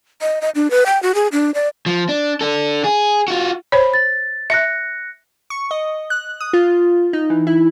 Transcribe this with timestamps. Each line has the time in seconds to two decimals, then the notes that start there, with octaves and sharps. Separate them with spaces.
0.22 D#5
0.41 D#5
0.55 D4
0.71 B4
0.86 G5
1.03 F#4
1.15 G#4
1.32 D4
1.55 D5
1.86 F3
2.09 D4
2.41 D4 A4
2.84 G#4
3.28 F4 F#4
3.72 C5 C#5 B5
3.94 A6
4.50 E5 F#6 A#6 C#7
5.50 C#6
5.71 D#5
6.10 F#6
6.40 D#6
6.53 F4
7.13 D#4
7.30 E3
7.47 E4